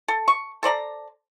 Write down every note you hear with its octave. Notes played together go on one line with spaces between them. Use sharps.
A4
C#6
A4 C5 D5 A#5